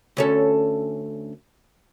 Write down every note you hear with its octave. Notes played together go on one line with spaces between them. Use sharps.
D2 C#4 A4